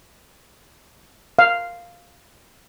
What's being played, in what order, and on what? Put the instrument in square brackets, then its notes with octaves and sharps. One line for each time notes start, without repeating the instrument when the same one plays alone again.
[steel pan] F5